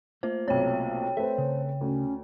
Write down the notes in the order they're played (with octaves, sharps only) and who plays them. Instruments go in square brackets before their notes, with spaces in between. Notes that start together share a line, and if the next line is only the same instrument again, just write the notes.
[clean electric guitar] A3 A#3 F4 [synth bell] C5
[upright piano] B1 C3 [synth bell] C#5 G5
[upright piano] A3 C4 B4 [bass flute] C5 [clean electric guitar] E5
[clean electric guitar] C#3
[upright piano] D2 [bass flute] C#4